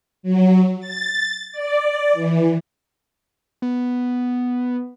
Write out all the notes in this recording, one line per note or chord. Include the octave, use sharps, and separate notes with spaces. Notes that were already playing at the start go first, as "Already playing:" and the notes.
F#3
A6
D5
E3
B3